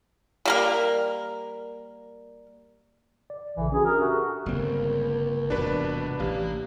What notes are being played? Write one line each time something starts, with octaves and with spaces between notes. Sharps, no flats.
G3 A#3 A#4
D5
A#1 C#3 E3 A4
C#4 D4 F#4 G#4
A#4
F#4 G4 A4 E5
G1 C#2 G3 A#3 C4
E1 G2 C3 D4 F#4 B4 B5
A1 A#3 G4 F5